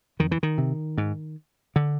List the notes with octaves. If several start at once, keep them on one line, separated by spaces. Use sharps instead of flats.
F2 D#3
E3
D#3
C3
G#2
D3